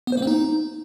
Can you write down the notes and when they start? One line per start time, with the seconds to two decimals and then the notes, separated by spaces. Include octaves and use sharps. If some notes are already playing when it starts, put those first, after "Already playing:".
0.07 B3
0.12 C5
0.17 A#3
0.22 C4
0.27 D#4